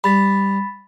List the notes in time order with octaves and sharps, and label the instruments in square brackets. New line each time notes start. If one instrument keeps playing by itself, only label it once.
[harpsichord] G3 [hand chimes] B5 A6 B6